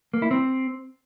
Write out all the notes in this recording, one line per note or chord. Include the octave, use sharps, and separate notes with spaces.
A#3
E4
C4